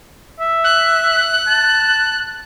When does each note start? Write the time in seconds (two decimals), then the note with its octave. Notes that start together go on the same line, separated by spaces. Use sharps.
0.40 E5
0.64 F#6
1.47 A5